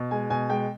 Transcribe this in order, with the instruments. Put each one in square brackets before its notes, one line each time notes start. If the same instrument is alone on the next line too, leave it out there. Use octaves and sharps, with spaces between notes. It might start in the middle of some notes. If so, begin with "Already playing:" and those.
Already playing: [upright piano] B2
G#3 G#5
B2 G#5
G#3 G5